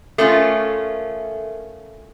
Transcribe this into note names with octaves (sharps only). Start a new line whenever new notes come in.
A3 C#4 F4 A4 A#4 E5